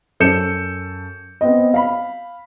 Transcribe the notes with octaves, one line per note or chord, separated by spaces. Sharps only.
F#2 A4 G6 C#7 E7
B3 C4 D#5
F5 B5